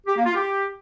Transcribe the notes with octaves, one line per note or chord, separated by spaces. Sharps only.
G4
A#3
F4
G4